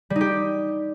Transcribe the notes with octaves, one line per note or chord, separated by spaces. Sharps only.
G3
D#4
G4